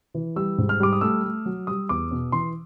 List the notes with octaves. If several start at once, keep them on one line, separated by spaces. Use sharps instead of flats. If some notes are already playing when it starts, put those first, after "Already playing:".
E3
G3 E6
G#2
F6
G3 D6
D#6
A3 E6
A3
F#3
G3 D#6
E2 D6
B2
E3 C6